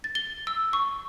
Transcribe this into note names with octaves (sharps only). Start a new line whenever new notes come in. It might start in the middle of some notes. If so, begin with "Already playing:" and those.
A6
G7
E6
C#6